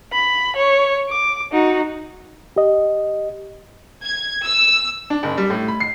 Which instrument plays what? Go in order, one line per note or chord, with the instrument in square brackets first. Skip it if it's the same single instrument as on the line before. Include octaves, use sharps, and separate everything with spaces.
[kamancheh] B5
C#5
D6
D#4 F#4
[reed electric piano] G4 D#5
[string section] G#6
E6
[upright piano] D4
F#1
G3
A2
B5
C7